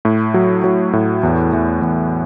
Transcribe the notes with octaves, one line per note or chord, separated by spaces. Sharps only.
A2
F#3
F#3
A2
E2
E2
E2